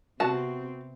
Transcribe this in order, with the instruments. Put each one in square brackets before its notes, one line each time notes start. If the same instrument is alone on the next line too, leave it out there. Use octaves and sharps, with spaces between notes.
[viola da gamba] C3 B3 C4 [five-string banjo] F#4 A5